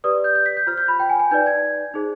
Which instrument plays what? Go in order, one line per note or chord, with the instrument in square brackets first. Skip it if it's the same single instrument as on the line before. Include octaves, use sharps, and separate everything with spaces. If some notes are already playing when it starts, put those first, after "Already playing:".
[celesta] G4 B4 D5 D#6
G6
G6
B6
G6
F4 C5 F6
G6
B5
G5
G#5
G#5
D#4 B4 D5 G6
G#6
D#4 G#4 C5